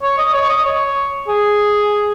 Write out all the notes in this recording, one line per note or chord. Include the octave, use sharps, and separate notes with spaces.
C#5
D#5
C#5
D#5
C#5
G#4